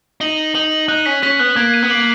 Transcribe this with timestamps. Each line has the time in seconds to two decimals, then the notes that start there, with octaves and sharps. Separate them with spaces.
0.21 D#4 F#7
0.38 F#7
0.55 D#4 F#7
0.72 F#7
0.88 D#4 F#6
1.06 C#4 B6
1.23 C#4 B6
1.39 B3 F#6
1.56 A#3 G#6
1.74 D#7
1.82 B3
1.90 A#3 F#7